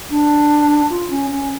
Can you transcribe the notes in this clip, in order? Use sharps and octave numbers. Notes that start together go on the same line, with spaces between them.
D4
F4
C#4
C#4